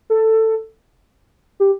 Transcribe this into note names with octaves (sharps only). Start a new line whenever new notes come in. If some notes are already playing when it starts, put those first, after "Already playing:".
A4
G4